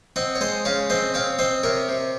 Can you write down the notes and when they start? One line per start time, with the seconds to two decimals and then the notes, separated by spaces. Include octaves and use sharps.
0.16 C4 D#5 F#5
0.35 C#5
0.41 G#3 C5 D#5
0.65 C#3 C#5 F5
0.90 C4 C5 D#5
1.14 C4 C#5 F5
1.39 C4 C5 D#5
1.63 C3 A#4 C#5
1.88 C3